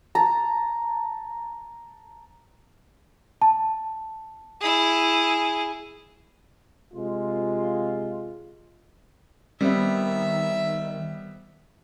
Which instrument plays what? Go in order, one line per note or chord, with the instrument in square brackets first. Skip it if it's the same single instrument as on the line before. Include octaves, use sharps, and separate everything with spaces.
[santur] A5 A#5
[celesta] A5
[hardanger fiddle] E4 G#4
[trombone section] C3 G#3 F4
[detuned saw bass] D#3 [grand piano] G3 B3 C4 [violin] E5